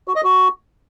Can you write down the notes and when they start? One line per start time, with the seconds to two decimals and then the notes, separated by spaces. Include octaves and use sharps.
0.08 F#4
0.16 D#5
0.24 F#4